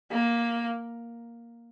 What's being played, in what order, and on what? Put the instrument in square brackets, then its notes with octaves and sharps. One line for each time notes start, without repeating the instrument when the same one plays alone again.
[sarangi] A#3